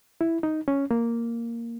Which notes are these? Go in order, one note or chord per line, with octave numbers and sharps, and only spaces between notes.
E4
D#4
C#4
A#3